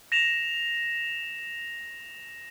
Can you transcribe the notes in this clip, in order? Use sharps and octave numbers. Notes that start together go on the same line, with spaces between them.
A#6 E7 F7